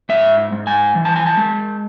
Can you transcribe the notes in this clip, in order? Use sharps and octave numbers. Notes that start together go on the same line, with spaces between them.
G#2 E5
G#2
G#5
E3
A5
G#5
A5
G#3